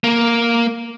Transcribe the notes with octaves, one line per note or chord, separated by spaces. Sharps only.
A#3